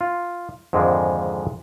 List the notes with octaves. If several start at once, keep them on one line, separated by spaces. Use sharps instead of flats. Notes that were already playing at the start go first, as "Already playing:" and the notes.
F4
F2 G#2 D3 D#3 F3 G#3